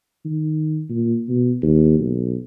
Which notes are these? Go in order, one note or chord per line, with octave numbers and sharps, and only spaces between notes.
D#3
A#2
B2
D#2
B1